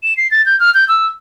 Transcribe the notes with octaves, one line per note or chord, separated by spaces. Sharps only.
E7
C7
A6
G6
F6
G6
E6